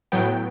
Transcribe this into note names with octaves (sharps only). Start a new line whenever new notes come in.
A2 F#3 B3 G5